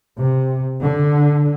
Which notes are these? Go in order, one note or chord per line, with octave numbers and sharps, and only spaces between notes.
C3
D3